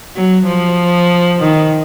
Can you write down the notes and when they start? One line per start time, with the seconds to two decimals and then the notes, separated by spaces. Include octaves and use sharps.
0.16 F#3
0.47 F3
1.40 D#3